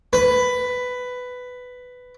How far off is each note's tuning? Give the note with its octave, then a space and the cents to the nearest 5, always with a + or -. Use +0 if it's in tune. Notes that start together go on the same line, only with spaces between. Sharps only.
B4 +10